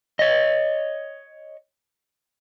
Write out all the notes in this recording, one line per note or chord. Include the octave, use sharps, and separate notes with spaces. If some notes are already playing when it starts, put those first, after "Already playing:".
C#5 D#5